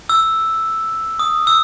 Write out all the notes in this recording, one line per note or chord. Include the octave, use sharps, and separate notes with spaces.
E6
D#6
E6